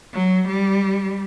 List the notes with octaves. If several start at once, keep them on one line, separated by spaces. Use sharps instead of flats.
F#3
G3